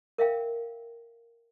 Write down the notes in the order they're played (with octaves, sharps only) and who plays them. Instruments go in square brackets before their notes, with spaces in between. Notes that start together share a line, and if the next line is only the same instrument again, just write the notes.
[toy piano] A#4 E5 F5 G5